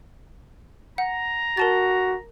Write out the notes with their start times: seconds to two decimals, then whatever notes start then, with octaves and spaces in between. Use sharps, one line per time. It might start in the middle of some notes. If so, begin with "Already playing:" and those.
0.98 F#5 A#5
1.57 F#4 A#4 A5 A6